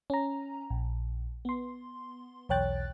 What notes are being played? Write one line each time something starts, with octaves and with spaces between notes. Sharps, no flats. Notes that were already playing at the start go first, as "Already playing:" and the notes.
C#4 A#5
A#1
B3 C6
B1 E2 C#5 G5 F#6 A6